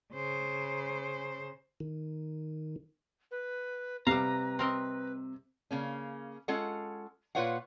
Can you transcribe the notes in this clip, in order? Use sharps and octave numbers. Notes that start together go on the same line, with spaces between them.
C#3 C5
D#3
B4
C3 G3 B4 F5 A#5
C4 A#4 D#5
C#3 A#3 C#4
G#3 C#4 F4 A4 F#5
A#2 F4 B4 C#5 F5 F#5